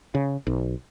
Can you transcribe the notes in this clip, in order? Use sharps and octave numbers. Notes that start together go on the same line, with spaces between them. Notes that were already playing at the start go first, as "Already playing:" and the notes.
C#3
B1